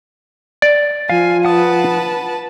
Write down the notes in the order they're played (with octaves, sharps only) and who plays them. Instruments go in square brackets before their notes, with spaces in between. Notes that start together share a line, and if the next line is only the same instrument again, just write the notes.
[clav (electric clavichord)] D5
[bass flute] F3 [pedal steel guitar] F5 [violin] G#5
[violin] B4 A5 [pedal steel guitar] F#5 D#6